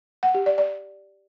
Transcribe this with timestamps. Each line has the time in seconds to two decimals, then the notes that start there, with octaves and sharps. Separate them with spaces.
0.23 F#5
0.35 G4
0.46 D5
0.58 D5